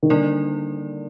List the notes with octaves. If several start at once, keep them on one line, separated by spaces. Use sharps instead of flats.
D#3
D3 G3 A#3 D#4 A#4 D5